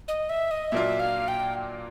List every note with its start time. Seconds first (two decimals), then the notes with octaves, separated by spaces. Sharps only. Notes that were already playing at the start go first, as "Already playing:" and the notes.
0.08 D#5
0.29 E5
0.51 D#5
0.72 A#2 F#3 A#3 D4 F4 E5
1.00 F5
1.28 G5